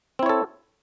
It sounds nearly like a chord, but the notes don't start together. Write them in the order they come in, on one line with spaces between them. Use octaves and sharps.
C4 E4 C#5 A4